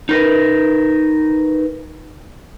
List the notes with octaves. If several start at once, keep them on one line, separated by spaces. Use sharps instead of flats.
D#4 A#4 B4